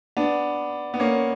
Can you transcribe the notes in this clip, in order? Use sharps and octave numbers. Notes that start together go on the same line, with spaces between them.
B3 D4
B3
A#3 C#4